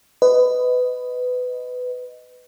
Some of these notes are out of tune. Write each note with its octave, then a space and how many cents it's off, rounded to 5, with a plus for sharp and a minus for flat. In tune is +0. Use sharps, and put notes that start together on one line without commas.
B4 +20 D#5 +0